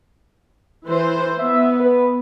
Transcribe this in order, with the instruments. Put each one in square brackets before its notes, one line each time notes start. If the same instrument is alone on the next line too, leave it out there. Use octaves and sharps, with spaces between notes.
[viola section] E3 C5
[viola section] B3 [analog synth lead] E5
[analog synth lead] B4